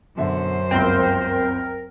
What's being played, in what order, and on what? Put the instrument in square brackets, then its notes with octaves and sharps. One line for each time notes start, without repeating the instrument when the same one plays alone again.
[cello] F#2 C5 [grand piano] B2 D3 E5
[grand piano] G1 C#2 C6 [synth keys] C4 G5 [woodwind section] A#4